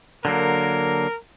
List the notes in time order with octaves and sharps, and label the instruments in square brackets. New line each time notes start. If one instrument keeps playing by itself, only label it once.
[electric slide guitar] D3 F#3 A#3 [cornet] A#4